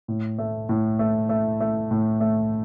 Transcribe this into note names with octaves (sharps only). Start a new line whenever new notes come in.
A2
A3
A2
A3
A3
A3
A2
A3